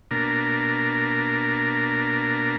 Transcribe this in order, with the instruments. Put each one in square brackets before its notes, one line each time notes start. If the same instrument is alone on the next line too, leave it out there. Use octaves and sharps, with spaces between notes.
[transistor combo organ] B2 A#3 D4 A#4